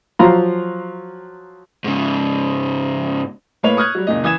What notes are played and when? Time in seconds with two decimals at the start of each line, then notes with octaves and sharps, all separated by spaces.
0.19 F3 F#3 F5 A#5 C6
1.84 G#2 C#3
3.63 A2 A#3 B4 C#5 F7
3.77 C#6 D#6 F6 F#6 G#6
3.95 F#3 G3
4.07 F#1 A#2 D#5
4.24 E3 D#6 G#6 E7